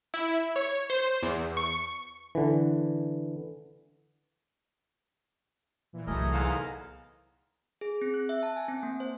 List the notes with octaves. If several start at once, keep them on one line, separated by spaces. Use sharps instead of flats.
E4
C#5
C5
E2
C#6
D3 E3
A#2 E3
C2 A#2 E3 F#3 A3 G#4 A#4 D#5
E2 G#2 F5
G#4
C4
F#6
E5
A5
G#5
C4
A#3
C5